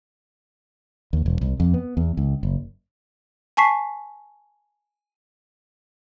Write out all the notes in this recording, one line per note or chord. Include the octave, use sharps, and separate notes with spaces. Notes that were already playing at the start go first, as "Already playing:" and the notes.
D#2
E1
C2
F2
B3
E2
C#2
F#1
G#5 A5 C#6 B6 C7